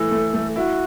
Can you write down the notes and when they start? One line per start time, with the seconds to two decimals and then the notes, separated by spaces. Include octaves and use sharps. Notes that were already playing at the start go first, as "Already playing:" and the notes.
Already playing: E3 A3 A4
0.11 A3
0.34 A3
0.56 E4 F#4